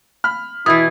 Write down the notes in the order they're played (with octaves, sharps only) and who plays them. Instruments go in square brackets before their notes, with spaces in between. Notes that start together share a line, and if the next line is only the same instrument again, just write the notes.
[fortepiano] B5 F6
[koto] B2 E3 [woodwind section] E4 [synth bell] D#6